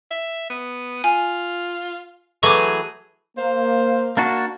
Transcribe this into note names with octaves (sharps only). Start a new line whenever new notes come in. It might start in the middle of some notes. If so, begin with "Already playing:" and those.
E5
B3
F4 G#5
E3 F#3 A3 G#4 C#6 D6
A#3 C5 F5
A#3 D4 F#4 A5